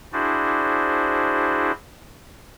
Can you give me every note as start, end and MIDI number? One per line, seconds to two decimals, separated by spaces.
0.13 1.72 62
0.13 1.72 64
0.13 1.72 66
0.13 1.72 68
0.13 1.72 72
0.13 1.72 74